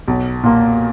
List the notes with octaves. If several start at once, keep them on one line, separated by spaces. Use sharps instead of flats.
B1
A#2 A#3